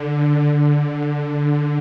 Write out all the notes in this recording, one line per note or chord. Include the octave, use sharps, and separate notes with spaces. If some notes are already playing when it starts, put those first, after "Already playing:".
Already playing: D3
D3
D3